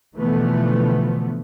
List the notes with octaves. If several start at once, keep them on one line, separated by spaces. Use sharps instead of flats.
B2 D3 E3 F3 A3 B3